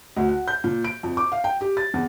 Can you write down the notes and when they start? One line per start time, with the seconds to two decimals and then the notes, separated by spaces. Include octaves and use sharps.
0.17 D2
0.29 F#5
0.48 G6
0.64 A#2
0.84 D7
1.03 F2
1.17 D6
1.32 F5
1.44 G5
1.61 G4
1.77 A6
1.94 E2